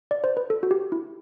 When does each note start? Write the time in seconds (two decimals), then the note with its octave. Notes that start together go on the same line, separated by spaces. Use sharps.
0.11 D5
0.24 C5
0.37 B4
0.50 A4
0.63 F#4
0.71 G4
0.92 E4